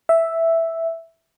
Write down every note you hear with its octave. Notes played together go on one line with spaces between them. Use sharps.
E5